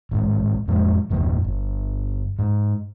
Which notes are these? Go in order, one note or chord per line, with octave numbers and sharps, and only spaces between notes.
A1 G#2
F2 A2 F3 G#3
G1 E2 G2 A#2
G1
G#2